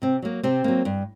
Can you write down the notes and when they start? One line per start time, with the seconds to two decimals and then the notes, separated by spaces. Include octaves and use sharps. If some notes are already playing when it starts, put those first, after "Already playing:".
0.02 C3 C4
0.22 F#3 A#3
0.43 C3 C4
0.64 F#3 A#3
0.85 G2